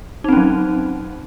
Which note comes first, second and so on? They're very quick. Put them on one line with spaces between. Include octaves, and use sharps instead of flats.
D#4 C4 C#4 F#3